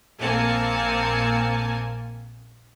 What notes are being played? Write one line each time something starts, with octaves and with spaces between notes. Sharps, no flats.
A#1 A#3 C4 G#5 A5 C#7